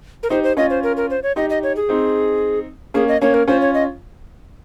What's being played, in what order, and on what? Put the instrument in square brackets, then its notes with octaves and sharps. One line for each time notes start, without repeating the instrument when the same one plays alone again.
[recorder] A#4
[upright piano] D#4 G4 [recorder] C5
[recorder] C5
[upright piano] C#4 F4 [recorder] D#5
[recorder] C5
A#4
A#4
C5
C#5
[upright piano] D#4 G4 [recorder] D#5
[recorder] D#5
C#5
G#4
[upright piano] C4 D#4
[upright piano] A#3 C#4 [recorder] G#4
[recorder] D#5
[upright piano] A#3 C#4 [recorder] C#5
[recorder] A#4
[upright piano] C#4 F4 [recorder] C5
[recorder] C#5
D#5